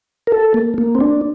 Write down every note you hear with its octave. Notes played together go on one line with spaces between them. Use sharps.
A#4
A4
A#3
A#3
C4
D4